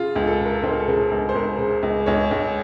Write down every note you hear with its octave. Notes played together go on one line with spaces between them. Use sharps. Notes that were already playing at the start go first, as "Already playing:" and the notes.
Already playing: C#3 F4
C#2
A4
C#3
A#4
C#2 C5
A#4
A4
C#3 A#4
C#2
C5
C#2 A#4
C#3
C#2
C#2 C#5
C#2